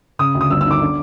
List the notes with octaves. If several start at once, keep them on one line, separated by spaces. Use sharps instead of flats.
C#3 D#6
D2
D#6
G1 E6
E6
D#3 D6
D3